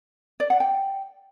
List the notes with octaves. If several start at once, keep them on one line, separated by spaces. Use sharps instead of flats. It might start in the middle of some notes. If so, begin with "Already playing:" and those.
D5
F#5
G5